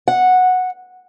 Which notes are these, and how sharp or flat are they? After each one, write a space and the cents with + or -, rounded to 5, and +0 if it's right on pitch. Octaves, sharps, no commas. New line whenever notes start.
F#5 -10